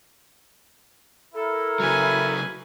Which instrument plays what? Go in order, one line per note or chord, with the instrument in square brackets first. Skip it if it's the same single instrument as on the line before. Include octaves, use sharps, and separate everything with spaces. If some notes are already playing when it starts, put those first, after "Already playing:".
[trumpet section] E4 A#4 [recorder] A4
[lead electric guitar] C#3 F#3 [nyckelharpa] B4 G#5